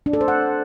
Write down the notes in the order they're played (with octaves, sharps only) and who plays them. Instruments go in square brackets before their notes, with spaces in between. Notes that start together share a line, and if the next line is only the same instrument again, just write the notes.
[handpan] D4
A4
C5
F#5